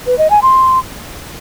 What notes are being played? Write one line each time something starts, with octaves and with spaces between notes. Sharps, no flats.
B4
D#5
G#5
C6